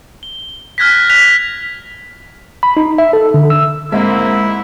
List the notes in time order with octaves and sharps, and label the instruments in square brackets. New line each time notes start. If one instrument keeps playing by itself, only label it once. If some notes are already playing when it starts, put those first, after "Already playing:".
[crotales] G7
F6 F#6 G#6 A#6 B6
F#6 B6 F7
[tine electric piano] B5
D#4
E5
A4
D3
E6
[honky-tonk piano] G#2 E5 [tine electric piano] G#3 [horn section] A#3 C4 [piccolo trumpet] E4